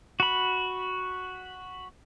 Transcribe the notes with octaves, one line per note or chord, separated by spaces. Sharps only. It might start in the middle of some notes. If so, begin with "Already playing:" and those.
F#4 B5